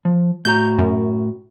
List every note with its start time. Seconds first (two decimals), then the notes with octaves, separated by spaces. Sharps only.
0.05 F3
0.45 A2 F#4 A#5 G6
0.79 F#2